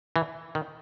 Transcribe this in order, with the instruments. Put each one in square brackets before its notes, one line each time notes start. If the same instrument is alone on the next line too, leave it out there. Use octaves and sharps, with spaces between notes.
[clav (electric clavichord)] E3
D#3